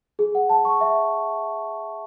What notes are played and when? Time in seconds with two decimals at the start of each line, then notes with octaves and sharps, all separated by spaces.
0.19 G#4
0.35 F#5
0.49 A5
0.65 C#6
0.81 E5